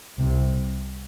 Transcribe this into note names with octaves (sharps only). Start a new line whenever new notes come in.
C2 C3